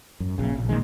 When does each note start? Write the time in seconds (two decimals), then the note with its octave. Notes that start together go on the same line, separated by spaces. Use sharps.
0.20 F#2
0.38 A#1 C#3
0.55 A#1
0.69 A#2 D3 D#3 G#3